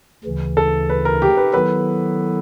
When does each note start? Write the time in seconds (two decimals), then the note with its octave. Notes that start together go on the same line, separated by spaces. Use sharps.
0.24 D2 C#3 E3
0.57 A4
0.90 B4
1.05 A#4
1.22 G4
1.37 B4
1.53 D#3 F#3 B3 E4 A4 B4